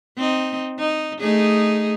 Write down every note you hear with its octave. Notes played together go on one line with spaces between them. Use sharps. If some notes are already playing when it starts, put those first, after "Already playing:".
C4 D#4
D#4
A3 D#4 G#4